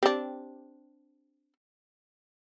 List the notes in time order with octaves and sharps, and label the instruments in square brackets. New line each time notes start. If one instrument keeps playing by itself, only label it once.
[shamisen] C4 D4 [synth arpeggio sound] G4